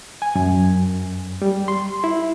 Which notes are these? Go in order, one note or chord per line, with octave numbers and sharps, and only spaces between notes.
G#5
F#2
G3
C6
E4